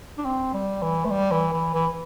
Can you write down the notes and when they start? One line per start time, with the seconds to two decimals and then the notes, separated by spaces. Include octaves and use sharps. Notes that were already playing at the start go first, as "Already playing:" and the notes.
0.18 D4
0.25 C4
0.54 G3
0.82 E3
1.05 A3
1.10 G3
1.31 E3
1.53 E3
1.74 E3